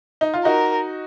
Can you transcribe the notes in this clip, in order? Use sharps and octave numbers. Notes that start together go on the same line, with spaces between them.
D#4
F4
D#4 F#4 A#4